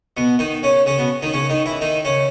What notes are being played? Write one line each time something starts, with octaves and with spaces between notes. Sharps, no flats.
B2 B3
D#3 D#4
C#3 C#4
C#3 C#4
B2 B3
D#3 D#4
C#3 C#4
D#3 D#4
E3 E4
D#3 D#4
C#3 C#4